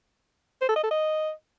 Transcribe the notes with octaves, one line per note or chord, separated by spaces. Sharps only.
C5
A4
D#5
A4
D#5